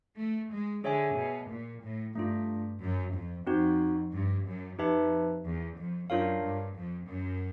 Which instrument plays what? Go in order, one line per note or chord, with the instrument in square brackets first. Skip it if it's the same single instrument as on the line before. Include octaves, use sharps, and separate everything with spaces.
[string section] A3
G#3
[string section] D3 [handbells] G#4 C#5 E5 G#5
[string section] B2
A#2
A2
[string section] G2 [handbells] A3 D4 F4
[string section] F#2
F2
[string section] F2 [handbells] C4 D#4 F#4
[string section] G2
F#2
[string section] F2 [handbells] D#4 G4 B4 E5 A5
[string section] E2
F2
[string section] F#2 [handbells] D4 F4 A#4 C#5 F5
[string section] G2
F2
F#2